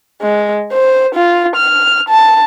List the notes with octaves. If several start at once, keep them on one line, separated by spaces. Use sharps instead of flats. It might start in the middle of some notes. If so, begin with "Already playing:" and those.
G#3
C5
F4
F6
A5